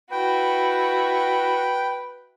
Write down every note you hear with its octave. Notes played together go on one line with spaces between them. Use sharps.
E4 F#4 B4 G5